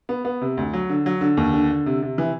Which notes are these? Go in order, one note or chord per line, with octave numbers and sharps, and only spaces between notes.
B3
B3
C3
D2
F#3
D3
F#3
D3
D#2
D3
D3
C3
C3
E3